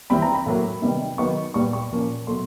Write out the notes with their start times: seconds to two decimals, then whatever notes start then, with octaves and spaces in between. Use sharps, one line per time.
0.10 E3 G3 C4 B5
0.22 A#5
0.34 B5
0.46 A2 F#3 A#3
0.82 C3 D#3 G3 B3
1.18 D#3 F#3 B3 C#6
1.54 A#2 G3 B3 C#6
1.73 C#6
1.91 A#2 F3 A#3 C#4
2.27 B2 F#3 A3 C6